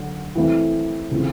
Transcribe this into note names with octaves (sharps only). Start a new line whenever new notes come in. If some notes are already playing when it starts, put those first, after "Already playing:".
Already playing: D3 F#3
E3 A3 C4 E4
C#3 E3 A3 C4 F4